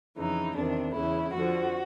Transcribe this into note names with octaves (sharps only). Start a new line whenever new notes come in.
F2 C#3 E3 D#4
E2 C3 D#3 D4
E2 C#3 E3 E4
F2 D3 F3 F#4